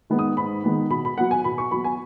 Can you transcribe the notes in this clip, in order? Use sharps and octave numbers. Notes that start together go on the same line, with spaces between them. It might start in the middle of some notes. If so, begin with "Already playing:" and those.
D#3 G#3 B3
D#6
G#2 B5
D#3 G#3 B3
B2 B5
B5
F#3 B3 F#5
G#5
B2 B5
C#6
F#3 B3 B5
G#5